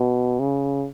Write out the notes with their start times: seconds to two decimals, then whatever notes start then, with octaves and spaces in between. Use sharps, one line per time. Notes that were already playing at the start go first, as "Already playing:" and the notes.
Already playing: B2
0.39 C#3